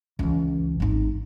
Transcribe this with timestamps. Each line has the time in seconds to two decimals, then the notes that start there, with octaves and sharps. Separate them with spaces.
0.19 C#2 E3
0.80 G#1 D#4